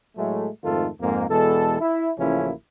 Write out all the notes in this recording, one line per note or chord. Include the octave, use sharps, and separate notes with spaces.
A2 F#3 G#3 A3
F2 G#2 D#3 A3 F4 A4
F2 G#2 A#3
E2 B2 E3 G#3 A4
E4
A1 C#3 F3 A#3 C#4 E4